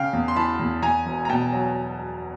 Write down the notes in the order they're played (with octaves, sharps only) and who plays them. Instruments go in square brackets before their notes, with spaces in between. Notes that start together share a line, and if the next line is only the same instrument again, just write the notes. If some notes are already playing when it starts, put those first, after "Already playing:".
Already playing: [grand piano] C#3 F5 G5
E2
C6
E3 A5 B5
E2
E2 G#5 A#5
E1
A#5
B2 G5 A5
F#3